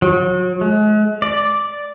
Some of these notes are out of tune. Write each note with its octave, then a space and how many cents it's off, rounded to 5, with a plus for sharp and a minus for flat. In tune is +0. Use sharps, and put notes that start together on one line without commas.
F#3 -35
G#3 +40
D5 -5